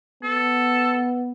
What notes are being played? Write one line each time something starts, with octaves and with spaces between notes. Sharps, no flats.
B3 A4